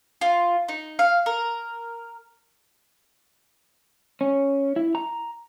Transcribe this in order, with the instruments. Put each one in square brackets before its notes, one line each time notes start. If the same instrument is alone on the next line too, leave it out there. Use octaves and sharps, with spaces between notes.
[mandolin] F4
D#4
F5
A#4
[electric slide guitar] C#4
E4
A#5